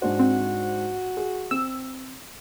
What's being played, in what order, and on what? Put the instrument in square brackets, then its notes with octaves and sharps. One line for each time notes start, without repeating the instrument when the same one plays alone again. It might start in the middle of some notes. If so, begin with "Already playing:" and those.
[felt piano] G#2 D4 C5 [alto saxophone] F#4
[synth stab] C4
[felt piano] G#4
[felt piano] C4 [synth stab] E6